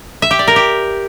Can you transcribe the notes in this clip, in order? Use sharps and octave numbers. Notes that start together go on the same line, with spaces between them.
E5
G4
D5
A#4
G4